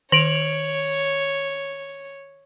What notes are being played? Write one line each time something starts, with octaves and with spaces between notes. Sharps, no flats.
D#3 C#5 D7 F7 F#7